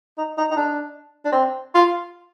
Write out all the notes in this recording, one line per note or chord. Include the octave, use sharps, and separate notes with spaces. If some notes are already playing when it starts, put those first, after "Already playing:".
D#4
D#4
D#4
D4
D4
C4
F4